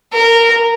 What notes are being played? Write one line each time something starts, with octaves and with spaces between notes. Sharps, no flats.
A#4